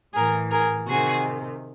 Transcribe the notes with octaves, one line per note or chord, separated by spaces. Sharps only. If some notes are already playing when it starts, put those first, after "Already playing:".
A2 E3 G#4 A#4
G#4 A#4
C3 D#3 F#4 G#4